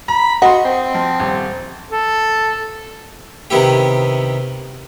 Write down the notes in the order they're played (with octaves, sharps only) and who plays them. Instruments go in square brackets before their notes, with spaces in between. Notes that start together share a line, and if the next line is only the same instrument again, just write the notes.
[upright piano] A#5 [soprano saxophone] B5
[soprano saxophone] F#4 [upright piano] D#5 C6 [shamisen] F#5
[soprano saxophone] C4
[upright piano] F3
D#1
[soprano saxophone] A4
[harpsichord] C3 D#3 B3 E4 G4